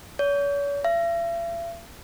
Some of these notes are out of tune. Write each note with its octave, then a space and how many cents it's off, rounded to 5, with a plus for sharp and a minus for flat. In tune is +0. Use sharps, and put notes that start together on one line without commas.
C#5 +40
E5 +45